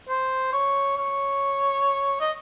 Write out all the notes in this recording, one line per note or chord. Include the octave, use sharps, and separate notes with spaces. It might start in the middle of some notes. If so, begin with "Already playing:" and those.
C5
C#5
C#5
D#5